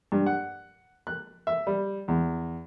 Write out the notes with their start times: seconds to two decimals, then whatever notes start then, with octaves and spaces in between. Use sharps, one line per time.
0.12 G2
0.26 F#5
1.07 F#6
1.47 E5
1.67 G3
2.08 E2